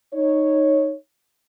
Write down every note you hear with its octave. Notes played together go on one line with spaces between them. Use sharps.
D#4 C#5